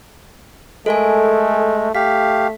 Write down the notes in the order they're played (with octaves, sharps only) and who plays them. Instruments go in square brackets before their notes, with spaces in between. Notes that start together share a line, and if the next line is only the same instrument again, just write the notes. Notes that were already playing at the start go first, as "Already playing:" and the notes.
[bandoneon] G#3 [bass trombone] A3 [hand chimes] A4 A#4 G#5
[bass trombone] A3 [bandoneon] G4 F5 [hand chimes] B6